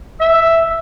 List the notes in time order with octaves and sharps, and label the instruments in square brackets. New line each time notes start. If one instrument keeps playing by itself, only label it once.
[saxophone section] E5